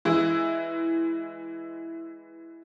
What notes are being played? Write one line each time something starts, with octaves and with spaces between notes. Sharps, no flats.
E3 G#3 E4